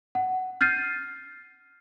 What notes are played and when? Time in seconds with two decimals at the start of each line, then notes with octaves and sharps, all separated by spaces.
0.15 F#5
0.61 F6 G6 A6 C7 D#7